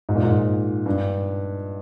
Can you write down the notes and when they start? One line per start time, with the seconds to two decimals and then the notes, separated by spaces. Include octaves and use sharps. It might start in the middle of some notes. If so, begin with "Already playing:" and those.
0.09 G#2
0.15 A#2
0.23 G#2
0.86 G2